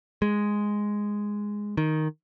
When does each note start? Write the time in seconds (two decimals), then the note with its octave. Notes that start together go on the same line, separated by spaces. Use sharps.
0.22 G#3
1.77 D#3